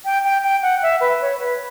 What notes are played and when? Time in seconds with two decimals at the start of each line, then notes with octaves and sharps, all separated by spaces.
0.05 G5
0.24 G5
0.43 G5
0.62 F#5
0.82 E5
1.01 B4
1.21 C#5
1.40 B4